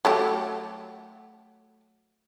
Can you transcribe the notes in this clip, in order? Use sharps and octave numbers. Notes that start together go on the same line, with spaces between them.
F#3 A3 G4